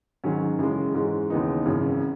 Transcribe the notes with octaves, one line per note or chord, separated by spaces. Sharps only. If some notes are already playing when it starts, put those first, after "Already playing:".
G#2 D#3 F#3 C#4
F#2 C#3 E3 G#3
G#2 E3 G#3 C#4
D#2 C#3 E3 B3 D#4
G#1 F#2 C#3 E3